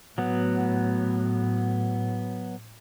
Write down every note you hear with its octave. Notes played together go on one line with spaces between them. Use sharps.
A2 F#3 B3